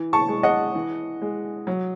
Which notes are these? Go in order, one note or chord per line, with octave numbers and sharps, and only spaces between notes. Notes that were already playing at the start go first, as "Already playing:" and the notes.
Already playing: E3
A5 C#6
G#3
D#5 F#5
E3
G#3
F#3